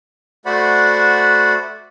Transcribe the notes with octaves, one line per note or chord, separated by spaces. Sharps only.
A3 F#4 C5 D5 F#5 B5